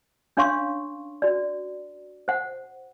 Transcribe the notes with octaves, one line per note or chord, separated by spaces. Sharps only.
C#4 D4 C#5 F5 C6 C#6
F#4 D5
C5 F#5